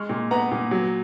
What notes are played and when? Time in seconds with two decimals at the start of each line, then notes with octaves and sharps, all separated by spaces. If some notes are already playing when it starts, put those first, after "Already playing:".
Already playing: G#3 C#6 F6
0.09 A#2
0.31 B3 F#5 A#5
0.51 A#2
0.71 F#3